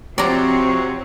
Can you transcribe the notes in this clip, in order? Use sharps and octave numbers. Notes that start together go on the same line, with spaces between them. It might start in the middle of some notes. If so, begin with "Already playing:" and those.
C3 F3 C4 F#4 C#5 D5 A#5